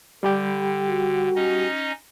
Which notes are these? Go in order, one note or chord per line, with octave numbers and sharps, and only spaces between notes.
D3 G3 G4 G5
F#4
C#4 D#4 D#5